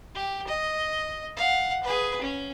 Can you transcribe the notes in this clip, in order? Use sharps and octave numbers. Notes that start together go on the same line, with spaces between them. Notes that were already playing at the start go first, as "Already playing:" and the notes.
G4
D#5
F5 F#5
G#4 B4
C#4